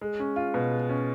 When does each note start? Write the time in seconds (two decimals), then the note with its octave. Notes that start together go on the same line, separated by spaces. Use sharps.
0.01 G#3
0.19 C#4
0.36 F4
0.54 B2
0.71 G#3
0.89 C#4